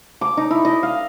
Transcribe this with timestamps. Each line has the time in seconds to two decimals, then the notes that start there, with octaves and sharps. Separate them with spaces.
0.21 D6
0.37 D#4
0.51 E4
0.65 D#5
0.83 F5